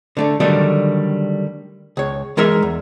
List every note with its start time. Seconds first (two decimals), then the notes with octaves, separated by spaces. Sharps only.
0.17 D3 A3 D4
0.40 D3 D#3 F#3 G3 A3 D4
1.97 C#2 C#5
2.37 E3 G#3 D#4 A#4 E5
2.62 E2